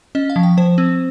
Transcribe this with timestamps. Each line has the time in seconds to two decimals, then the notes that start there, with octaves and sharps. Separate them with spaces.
0.15 C#4 D#5
0.30 F5
0.36 F3
0.43 G5
0.57 F3 C5
0.78 C4